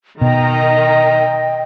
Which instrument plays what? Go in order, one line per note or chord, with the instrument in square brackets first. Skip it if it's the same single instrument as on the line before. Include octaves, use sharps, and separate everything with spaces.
[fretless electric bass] B2 [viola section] D#3 A#5 [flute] D#5 [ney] G5